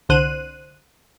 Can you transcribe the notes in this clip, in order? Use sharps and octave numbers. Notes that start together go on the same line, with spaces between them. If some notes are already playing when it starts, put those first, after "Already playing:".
C2 D3 C5 F#6 D#7